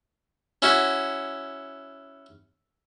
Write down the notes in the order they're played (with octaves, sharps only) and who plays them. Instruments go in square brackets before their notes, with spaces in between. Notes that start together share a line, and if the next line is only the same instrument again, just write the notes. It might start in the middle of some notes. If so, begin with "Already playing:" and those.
[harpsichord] C#4 E4 F#4